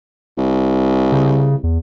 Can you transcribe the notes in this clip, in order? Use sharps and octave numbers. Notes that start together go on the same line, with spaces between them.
C2
C#3
E2